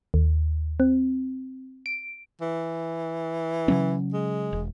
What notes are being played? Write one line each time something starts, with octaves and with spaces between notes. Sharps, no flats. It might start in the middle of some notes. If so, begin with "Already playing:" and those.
D#2
C4
D7
E3
C#3 F#3 C#4
G#3
E1